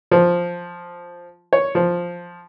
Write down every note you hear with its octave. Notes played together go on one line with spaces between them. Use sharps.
F3
C#5
F3